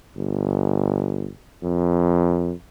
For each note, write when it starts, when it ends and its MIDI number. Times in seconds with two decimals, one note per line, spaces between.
0.17 1.30 31
1.63 2.53 41